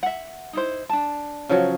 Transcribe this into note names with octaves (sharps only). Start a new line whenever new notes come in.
E5 F#5
D#4 E4 C5
D4 A5
C#3 F3 F#3